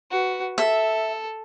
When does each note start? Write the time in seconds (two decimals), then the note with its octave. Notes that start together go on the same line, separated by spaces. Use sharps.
0.11 F#4 B4
0.58 A4 E5